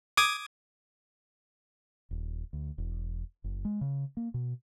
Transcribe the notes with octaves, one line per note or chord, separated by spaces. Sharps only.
D6 D#6 G#6
D#1
D2
E1
F#1
G#3
C#3
A#3
B2